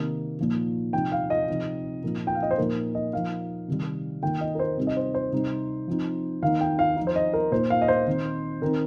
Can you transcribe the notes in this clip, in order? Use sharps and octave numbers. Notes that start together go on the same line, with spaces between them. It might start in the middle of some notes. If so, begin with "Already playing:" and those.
Already playing: C3 D#3 A#3 D#4
A#2 F3 D#4
C3 F3 D#4 G5
F5
D#5
C3 F3 C4 D#4
A#2 F3 A#3 D#4
G5
F5
D#5
C5
A#2 F3 D#4 A#4
D#5
F3 A#3 D#4 F5
C3 D#3 G3
D#3 A#3 D#4 G5
D#5
A#4
C5
C3 G3 C4 D#4
D#5
C5
C5
C3 G3 D#4
F3 C4 D#4
D#3 A#3 D#4 F5
G5
F5
F3 D#4
C5
D#5
A#4
A#2 A#3 D#4 C5
F5
D#5
C5
D#3 C4 D#4
D#3 C4 D#4 A#4